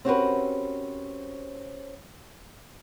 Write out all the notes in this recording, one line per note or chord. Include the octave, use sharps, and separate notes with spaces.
C4 C#4 F#4 G4 A#4 B4